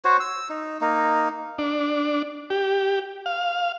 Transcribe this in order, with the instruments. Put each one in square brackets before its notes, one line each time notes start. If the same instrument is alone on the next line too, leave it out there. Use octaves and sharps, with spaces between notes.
[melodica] F#4 C5 C#5
E6
D#4
A#3 D#4
[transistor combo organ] D4
G4
F5